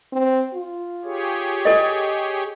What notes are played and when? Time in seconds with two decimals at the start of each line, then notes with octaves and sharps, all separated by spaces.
0.13 C4
0.54 F4
1.04 G4 G#4 C#5
1.65 A4 D#5